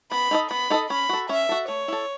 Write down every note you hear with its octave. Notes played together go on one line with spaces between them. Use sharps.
B3 B5
D#4 A4 D#5
B3 B5
D#4 A4 D#5
C#4 B5
F#4 A4
C#4 E5
F#4 A4
A3 C#5
E4 A4